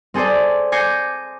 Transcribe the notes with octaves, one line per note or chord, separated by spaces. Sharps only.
C4 G#4 A4 C5 D5
G#5 D6 G6 A#6 C7 C#7